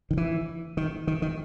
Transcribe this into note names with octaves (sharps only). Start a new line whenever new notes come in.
D#3
E3
D#3
D#3
D#3